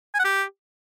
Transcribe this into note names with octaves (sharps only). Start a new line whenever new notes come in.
G#5
F#5
G4